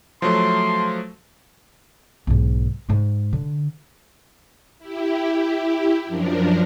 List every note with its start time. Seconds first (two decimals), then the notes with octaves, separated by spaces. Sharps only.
0.22 F3 F#3 A3 C6
2.27 B1 G#2
2.89 G#2 G#3
3.33 D3
4.79 E4 G4
6.05 F#2 F3 D4 A#4